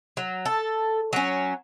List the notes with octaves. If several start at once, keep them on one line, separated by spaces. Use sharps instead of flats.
F#3
A4
F#3 C#4